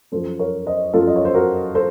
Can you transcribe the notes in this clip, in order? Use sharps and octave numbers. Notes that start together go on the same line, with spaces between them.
F#2 F3 A4 C5
A#4 C#5
C5 D#5
F#2 F3 F4 A4
D#5
C#5
C5
F#4 A#4
A4 C5